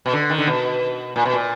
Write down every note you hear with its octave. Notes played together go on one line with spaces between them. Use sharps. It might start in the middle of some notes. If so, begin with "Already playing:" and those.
B2
D3
D#3
D3
B2
A#2
B2
A#2